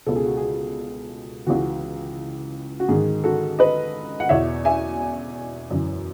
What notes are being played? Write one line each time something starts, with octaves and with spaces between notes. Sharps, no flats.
C#2 B2 A4
G#4
F#4
G#4
C#2 C#3 E3 F#4
F#4
G#2 D#3 G#4
F#4 A4
B4 D#5
F#5
E2 B2 C#5 E5
E5 G#5
F#2 E3